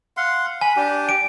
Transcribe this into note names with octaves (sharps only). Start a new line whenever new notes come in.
F5 F#5 C6
G#5 B5
D4 G4
D7